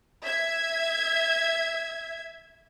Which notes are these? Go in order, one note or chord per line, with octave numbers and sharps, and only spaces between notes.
E5 G#6